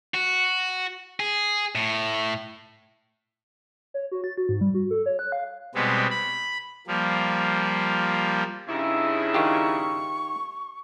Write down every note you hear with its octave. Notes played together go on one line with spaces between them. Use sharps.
F#4
G#4
A2
C#5
F#4
A6
F#4
G#2
G3
F#4
A4
C#5
F#6
F5
B2 G3 G#3 B3 C4
B5
F3 G3 A#3
G2 C#3 D#4 E4
D#3 F4 G4 C#6